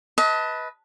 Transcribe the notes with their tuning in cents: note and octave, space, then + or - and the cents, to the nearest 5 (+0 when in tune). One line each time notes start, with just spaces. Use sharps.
B4 +0 D#5 +35 A5 +0